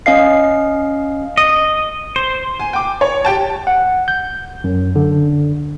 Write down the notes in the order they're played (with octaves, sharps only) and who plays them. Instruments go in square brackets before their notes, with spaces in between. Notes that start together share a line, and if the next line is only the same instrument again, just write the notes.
[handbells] C#4 D#5 F5 C7
[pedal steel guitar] D#5
C5
[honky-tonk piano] G#5
G5 D6
C#5
G4 G5 A5
[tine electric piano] F#5
G6
F#2
D3